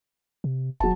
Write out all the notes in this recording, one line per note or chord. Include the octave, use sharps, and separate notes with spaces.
C3
E1 F#3 A5